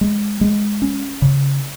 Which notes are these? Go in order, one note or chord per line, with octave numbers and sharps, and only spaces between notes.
G#3
G#3
C#4
C#3